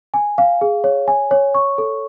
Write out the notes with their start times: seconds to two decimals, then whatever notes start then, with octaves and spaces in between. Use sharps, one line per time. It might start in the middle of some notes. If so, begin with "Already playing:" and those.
0.14 G#5
0.38 F5
0.61 G#4
0.84 C#5
1.08 G#5
1.31 C#5
1.54 C#6
1.78 A4